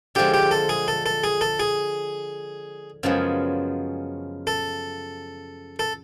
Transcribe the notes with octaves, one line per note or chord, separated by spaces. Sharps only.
D3 F3 G#3 G4
G4
A4
G#4
A4
A4
G#4
A4
G#4
F#2 C#3 F3 G#3 B3
A4
A4